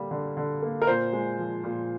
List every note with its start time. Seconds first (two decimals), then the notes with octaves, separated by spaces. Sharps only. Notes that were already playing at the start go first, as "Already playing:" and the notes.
Already playing: D3 G3 A#3
0.11 D3
0.37 D3
0.62 A#3
0.82 A#4
0.87 A#2 C5
1.13 G#3
1.39 F3
1.64 A#2